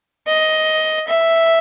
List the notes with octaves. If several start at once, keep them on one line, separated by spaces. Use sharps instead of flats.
D#5
E5